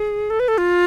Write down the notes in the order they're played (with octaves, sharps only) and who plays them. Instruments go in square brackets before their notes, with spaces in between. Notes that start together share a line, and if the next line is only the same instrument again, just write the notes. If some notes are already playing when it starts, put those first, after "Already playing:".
Already playing: [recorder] G#4
A4
B4
A4
F4